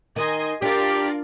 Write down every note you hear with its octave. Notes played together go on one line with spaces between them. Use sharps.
D#3 D#5 G#5 C6
D4 F4 G4 A#4 D5